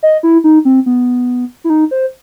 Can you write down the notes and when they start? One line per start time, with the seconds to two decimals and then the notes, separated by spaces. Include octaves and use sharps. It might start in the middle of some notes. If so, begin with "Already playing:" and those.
0.03 D#5
0.23 E4
0.44 D#4
0.65 C4
0.86 B3
1.64 E4
1.70 D#4
1.91 C5